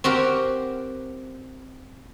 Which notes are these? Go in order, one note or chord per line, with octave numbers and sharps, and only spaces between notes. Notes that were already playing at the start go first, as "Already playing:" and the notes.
C4 F#4 G4 A#4